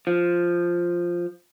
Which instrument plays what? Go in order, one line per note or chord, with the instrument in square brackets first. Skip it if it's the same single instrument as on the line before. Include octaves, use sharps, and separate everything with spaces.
[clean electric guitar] F3